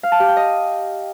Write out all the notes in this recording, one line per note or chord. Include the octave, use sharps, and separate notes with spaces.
F5
A5
G4
G5
D#5